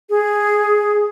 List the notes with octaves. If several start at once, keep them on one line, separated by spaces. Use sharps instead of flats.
G#4